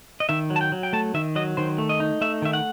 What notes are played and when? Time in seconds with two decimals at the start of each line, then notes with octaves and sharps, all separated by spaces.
0.20 D#5
0.29 D#3 E5
0.50 F#3
0.56 A5
0.61 G5
0.72 F#3
0.83 G5
0.93 A3 A5
1.14 D#3 E5
1.36 F#3 D#5
1.57 D#3 C5
1.78 A3
1.89 D#5
2.00 D#4
2.21 A3 E5
2.42 D#3 E5
2.53 F#5